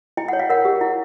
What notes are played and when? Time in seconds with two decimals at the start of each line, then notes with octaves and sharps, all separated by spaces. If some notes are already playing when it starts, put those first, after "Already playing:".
0.17 E4 G5
0.28 C#5 F#5
0.40 F5
0.49 A#4 F#5
0.65 G4
0.81 E4